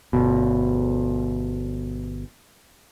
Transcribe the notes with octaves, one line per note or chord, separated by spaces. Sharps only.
G1 B2